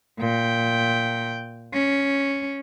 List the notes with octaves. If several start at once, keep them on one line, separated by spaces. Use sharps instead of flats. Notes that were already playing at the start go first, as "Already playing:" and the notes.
A#2 G5
C#4